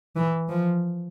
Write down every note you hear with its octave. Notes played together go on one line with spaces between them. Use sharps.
E3
F3